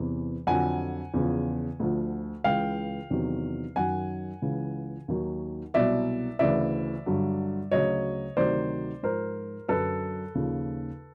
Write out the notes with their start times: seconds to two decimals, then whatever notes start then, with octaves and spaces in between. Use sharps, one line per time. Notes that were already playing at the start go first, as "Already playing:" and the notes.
Already playing: E2 C3 E3
0.47 F2 D3 F#3 F#5 G#5
1.14 E2 C#3 F3
1.80 D2 D3 F3
2.44 C#2 C#3 E3 F5 G5
3.10 E2 C3 D#3 F#3
3.76 F#2 D#3 F#3 F#5 G#5
4.42 C#2 C#3 E3
5.08 D#2 D#3 F#3
5.74 C2 B2 F#3 D5 E5
6.39 D2 C#3 E3 D5 E5
7.06 G2 D3 F#3
7.72 D2 C#3 F#3 C#5 D#5
8.37 D2 C3 D#3 F#3 C5 D5
9.03 G#2 F3 A#4 C5
9.68 F#2 D3 F#3 A4 B4
10.35 D#2 C#3 F3